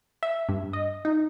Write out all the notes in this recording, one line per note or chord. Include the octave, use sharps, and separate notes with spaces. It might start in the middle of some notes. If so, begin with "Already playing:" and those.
E5
G2
D#5
D#4